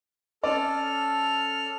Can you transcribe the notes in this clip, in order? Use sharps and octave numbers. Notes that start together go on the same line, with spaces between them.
C#4 A4 D5 F6